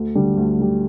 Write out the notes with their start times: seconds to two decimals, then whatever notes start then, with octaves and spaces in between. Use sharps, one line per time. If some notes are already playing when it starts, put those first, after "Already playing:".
Already playing: D2
0.15 D3 G3
0.37 D2
0.59 D3 G3